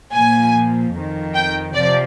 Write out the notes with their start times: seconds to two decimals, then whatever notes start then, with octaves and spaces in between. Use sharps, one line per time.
0.13 A#2 F3 G#5
0.94 F2 D#3
1.34 G5
1.74 C3 F3 D5